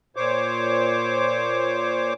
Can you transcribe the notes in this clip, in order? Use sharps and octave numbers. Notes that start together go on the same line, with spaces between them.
A#2 C5 C#5 D6